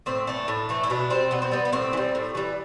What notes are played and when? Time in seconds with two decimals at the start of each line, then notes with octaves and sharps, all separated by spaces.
0.06 A2 C4
0.27 E3 A3 D4
0.48 A2
0.69 E3 A3
0.83 E4
0.90 B2 D4
1.10 G3 C4
1.31 B2 B3
1.42 C4
1.52 G3 B3
1.65 B3
1.73 A2 C4
1.93 E3
1.97 G3
2.15 A2
2.35 E3 G3